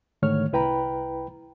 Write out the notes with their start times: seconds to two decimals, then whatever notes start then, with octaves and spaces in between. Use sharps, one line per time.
0.22 G#2 D3 D#3 A3 C#5 F6
0.53 C2 E4 B4 G5 A#5 B5